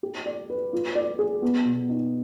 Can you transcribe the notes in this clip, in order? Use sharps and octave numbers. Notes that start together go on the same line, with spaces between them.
G4
D5
B4
F4
D5
G#4
B3
B2
D#4